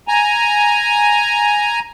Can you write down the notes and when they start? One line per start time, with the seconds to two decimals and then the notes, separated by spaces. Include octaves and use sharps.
0.08 G#5 A#5